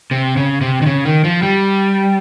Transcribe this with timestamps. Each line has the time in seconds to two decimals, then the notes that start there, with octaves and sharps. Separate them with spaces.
0.11 C3
0.37 C#3
0.61 C3
0.82 D#3
0.86 C#3
1.05 D#3
1.24 F3
1.43 G3